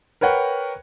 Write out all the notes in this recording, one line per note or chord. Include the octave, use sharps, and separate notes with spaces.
A#4 B4 C#5 F#5 G5